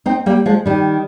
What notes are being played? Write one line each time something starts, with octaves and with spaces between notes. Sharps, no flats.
C4 D#4
G3 A#3
F3 G#3
D#3 G3